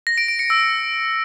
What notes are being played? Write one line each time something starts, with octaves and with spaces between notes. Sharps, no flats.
A#6
D7
D7
C#7
E6